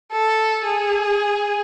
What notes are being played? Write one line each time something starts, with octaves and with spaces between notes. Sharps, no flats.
A4
G#4